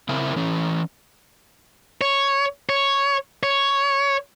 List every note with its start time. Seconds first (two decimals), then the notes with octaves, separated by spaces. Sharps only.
0.09 C#3 C4 E4 A#4
0.36 E3 C#4
2.01 C#5
2.69 C#5
3.43 C#5